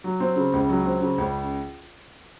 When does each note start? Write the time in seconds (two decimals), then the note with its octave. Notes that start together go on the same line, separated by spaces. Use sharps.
0.04 F#3
0.20 C4
0.36 C#3
0.53 C#2
0.69 F#3
0.86 C4
1.01 C#3
1.18 C#2